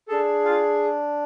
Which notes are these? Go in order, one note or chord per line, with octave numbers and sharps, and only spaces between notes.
D4 G#4 A4 A5
F4 F5